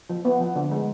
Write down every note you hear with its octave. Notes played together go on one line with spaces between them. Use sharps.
F3
B3
F3
D3
G#3